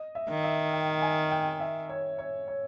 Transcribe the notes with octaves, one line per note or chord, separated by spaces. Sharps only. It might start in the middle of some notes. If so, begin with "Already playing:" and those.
Already playing: D#5
E5
D#3
E5
G5
G#5
G5
E5
C#5
C#5
C#5